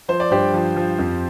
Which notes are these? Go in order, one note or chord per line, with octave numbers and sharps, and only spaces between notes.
F3 C5
D5
G2 G4 C5
F3
F3
F2